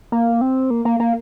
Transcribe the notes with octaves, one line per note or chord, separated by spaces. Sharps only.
A#3
C4
A#3
A#3
A#3